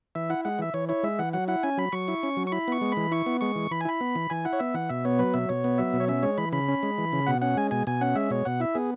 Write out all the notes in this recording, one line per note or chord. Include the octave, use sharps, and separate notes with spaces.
E3 E5
E4 F#5
G#3 F#5
E3 E5
E3 C#5
E4 C#5
G#3 E5
E3 F#5
F#3 F#5
E4 F#5
C#4 G#5
F#3 B5
F#3 C#6
E4
C#4
F#3
C#6
E4 B5
B3 C#6
G#3
E3 B5
E4 C#6
B3
G#3 C#6
E3
E3 B5
G#5
E4 B5
B3
E3
E3 G#5
E4 F#5
C#5
B3 E5
E3 F#5
B2 E5
B3 C#5
F#3 B4
B2 E5
B2 C#5
B3
F#3 E5
B2
C#5
C#4 E5
G#3 C#5
E3 B5
C#3 B5
C#4
G#3
E3
C#3
B2 F#5
C#4 F#5
G#3 G#5
B2 G#5
B2 G#5
C#4 F#5
G#3 E5
B2 C#5
B2 F#5
E4 E5
B3 G#4